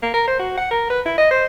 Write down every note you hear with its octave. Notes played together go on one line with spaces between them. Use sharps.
A#3
A#4
C5
F#4
F#5
A#4
B4
E4
D#5
C5